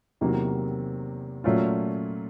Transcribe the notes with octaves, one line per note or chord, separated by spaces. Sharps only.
E2 C3 D#3 F#3 A#3
A#2 F#3 A3 C#4 F4